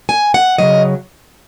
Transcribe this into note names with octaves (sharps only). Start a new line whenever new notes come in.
G#5
F#5
C#3 F#3 D#5